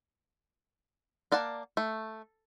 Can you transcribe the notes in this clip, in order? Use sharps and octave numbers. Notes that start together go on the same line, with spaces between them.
A#3 D5 F#5 A5
A3